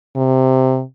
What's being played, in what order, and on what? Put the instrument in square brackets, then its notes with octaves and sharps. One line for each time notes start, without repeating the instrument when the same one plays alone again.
[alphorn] C3